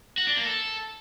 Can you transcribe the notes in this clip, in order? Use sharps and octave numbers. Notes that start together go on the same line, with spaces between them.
F#4
D4
A#3
A4